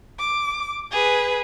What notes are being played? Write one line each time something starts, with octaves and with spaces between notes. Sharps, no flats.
D6
G#4 B4